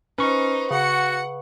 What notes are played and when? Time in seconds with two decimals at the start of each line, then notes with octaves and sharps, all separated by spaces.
0.18 C#4 D#4 B4 C5 C#6
0.71 C#3 F#4 F#5 C#7